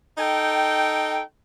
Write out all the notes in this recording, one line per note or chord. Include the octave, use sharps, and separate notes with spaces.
D#4 A4 G5